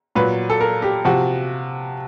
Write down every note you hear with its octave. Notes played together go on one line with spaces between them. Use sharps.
A#2 F#3 B4
A4
A#4
G4
C3 F3 F#4